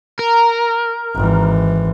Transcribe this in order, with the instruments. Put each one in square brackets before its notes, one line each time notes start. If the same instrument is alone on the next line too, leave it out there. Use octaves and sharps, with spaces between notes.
[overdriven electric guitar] A#4
[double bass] G#1 E3